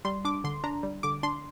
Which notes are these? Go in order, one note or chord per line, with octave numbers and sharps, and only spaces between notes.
G3 C6
D4 D6
D3 C6
D4 A#5
G3
D3 D6
D4 C6